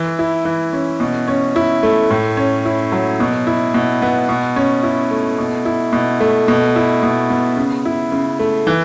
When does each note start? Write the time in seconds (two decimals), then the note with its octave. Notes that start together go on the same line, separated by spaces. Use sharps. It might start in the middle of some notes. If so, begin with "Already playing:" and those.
Already playing: E3
0.19 E4
0.45 E3
0.73 C#4
1.00 B2
1.28 C#4
1.56 E4
1.83 A3
2.11 A2
2.37 C#4
2.65 E4
2.92 F#3
3.20 B2
3.47 E4
3.74 B2
4.02 B3
4.29 B2
4.56 C#4
4.83 E4
5.11 A3
5.38 B2
5.65 E4
5.93 B2
6.20 A3
6.48 B2
6.76 E4
7.03 B2
7.30 B3
7.57 C#3
7.85 E4
8.12 C#3
8.39 A3
8.67 E3